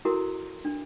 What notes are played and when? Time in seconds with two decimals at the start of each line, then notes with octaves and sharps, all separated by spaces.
0.05 E4 F#4 A4 A#4 A#5 C6
0.65 D4